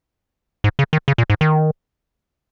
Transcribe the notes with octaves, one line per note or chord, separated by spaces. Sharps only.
G#2
C#3
D#3
C#3
A#2
G#2
D#3